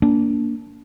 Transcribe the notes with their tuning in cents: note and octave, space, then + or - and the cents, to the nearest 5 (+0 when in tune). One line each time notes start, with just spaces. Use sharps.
A#3 +0 D4 -25